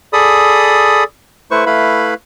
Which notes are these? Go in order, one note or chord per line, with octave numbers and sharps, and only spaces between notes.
G#4 A4 D5 B5 D#6
A3 E4 B4 C5 C#6
A3 E4 B4 F5 B5